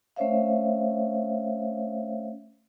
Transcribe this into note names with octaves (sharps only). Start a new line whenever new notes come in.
A3 C#4 C5 C#5 E5 F5